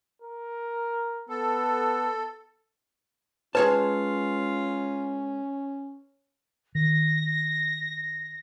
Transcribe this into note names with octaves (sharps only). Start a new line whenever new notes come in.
A#4
B3 A4
G#3 C#4 F4 B4 C#5 A5
D#3 A#6